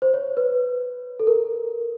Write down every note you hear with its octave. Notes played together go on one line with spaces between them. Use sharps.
C5
C#5
B4
A4
A#4